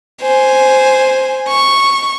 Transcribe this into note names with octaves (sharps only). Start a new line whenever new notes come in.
C5 G#5
C#6